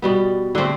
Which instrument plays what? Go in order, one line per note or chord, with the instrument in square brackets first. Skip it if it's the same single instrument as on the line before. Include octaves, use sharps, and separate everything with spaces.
[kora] B2 G3 B3
D3 A3 C4